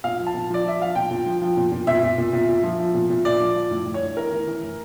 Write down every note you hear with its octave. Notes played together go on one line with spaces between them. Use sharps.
A#2 F5
F3
A5
A#2
F3 D5
F3 E5
F3 F5
A#2 G5
A#2
F3
F3
A#2
A#2
A#2 E5
A#2
A#2
A#2
A#2
F3
F3
A#2
A#2
A#2 D5
F3
F3
A2
A2
C#5
A2
E3 A#4
E3
E3
A2